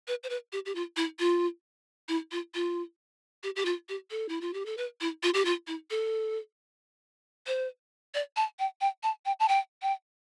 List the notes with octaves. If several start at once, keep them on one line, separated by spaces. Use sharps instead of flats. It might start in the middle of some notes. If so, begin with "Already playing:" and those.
B4
C5
B4
G4
G4
F4
E4
F4
E4
F4
F4
G4
G4
F4
G4
A4
E4
F4
G4
A4
B4
E4
F4
G4
F4
E4
A4
C5
D5
A5
G5
G5
A5
G5
A5
G5
G5